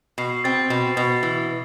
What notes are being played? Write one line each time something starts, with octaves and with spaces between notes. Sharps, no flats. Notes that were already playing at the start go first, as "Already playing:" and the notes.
B2 C7
C4 A6
B2
B2
E3